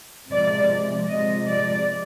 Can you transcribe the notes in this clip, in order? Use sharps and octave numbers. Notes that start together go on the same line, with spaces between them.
C3 F3 G#3 D5
C3 F3 G#3 D#5
D5